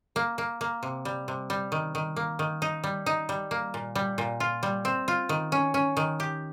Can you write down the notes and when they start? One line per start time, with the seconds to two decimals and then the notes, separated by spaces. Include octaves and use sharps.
0.16 A#3
0.38 A#3
0.61 A#3
0.83 C3
1.05 G3
1.28 C3
1.50 G3
1.72 D#3
1.95 D#3
2.16 A#3
2.39 D#3
2.62 D#4
2.84 G3
3.06 D#4
3.29 G3
3.51 A#3
3.74 A#2
3.95 G3
4.18 A#2
4.40 F4
4.63 G3
4.85 C4
5.08 F4
5.29 D#3
5.52 C#4
5.74 C#4
5.97 D#3
6.20 G4